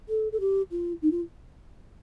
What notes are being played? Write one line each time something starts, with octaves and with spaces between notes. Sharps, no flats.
A4
A4
G4
F4
D#4
F4